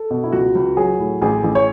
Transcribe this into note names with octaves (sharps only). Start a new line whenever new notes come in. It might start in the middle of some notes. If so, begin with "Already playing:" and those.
Already playing: A4
B2
E4
C#2 F#4
C#2
F#3 G#4
A2
A1 G#4
A1
C#5